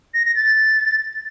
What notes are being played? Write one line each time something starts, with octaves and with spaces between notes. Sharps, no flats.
A#6
A#6
A6